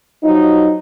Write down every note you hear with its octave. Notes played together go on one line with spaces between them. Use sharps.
F3 F#3 D#4